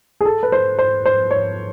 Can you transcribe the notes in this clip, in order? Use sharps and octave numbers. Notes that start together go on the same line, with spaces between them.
G#4
A4
B4
C5
C5
C5
C#5